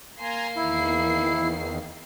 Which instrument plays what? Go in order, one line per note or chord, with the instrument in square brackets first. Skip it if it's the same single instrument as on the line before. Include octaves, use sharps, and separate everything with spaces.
[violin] A#3 C7 [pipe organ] G#5 A#5 C6
[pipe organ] E2 D#3 [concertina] E4